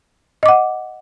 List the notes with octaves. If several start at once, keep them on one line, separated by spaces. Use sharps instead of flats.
D#5 F#5 D6